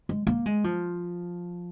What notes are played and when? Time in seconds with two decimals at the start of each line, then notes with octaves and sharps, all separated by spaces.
0.09 G#3
0.27 A#3
0.46 G#3
0.64 F3